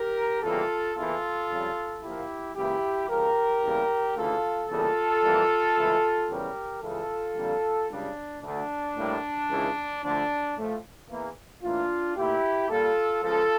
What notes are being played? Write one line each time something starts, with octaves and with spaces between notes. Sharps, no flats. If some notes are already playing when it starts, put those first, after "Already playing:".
Already playing: G4 A#4
E2 C#3 E3 G3 A#3 F4 A4
E2 E3 A#3 F4 A4
F2 C#3 G3
A#2 F3 A#3 E4 G4
C#2 C#3 E3 A#3 E4 G4
C#2 C#3 F3 G4 A#4
E2 C#3 G3 A#3
D2 C#3 E3 F4 A4
E2 C#3 E3 G3 A#3 F4 A4
F2 E3 G3 A#3
C#2 C#3 E3 A3
E2 C#3 E3 G3 G4 A#4
C#2 C#3 E3 F4 A4
F2 D3 G3 A#3
C#2 C#3 G3 D4
D2 D3 A3 D4
A2 G3 A#3
C#2 C#3 E3
D2 D3 F3 D4
A2 F3 A3
E2 E3 A#3
A2 E3 A#3 D4 F4
A#2 A3 E4 G4
A#2 G3 A#3 F4 A4
C#2 C#3 F3 F4 A4